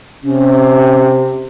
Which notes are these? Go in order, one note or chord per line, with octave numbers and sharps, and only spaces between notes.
C3 C#4